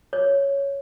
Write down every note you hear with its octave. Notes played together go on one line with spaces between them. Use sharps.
C#5